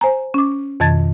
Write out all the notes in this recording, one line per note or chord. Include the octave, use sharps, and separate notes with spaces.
C5 G#5 A#5
C#4 D6
F2 B2 D#3 A5 G#6 A6